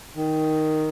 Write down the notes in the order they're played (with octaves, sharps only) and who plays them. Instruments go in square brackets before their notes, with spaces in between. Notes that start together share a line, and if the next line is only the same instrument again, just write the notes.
[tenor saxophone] D#3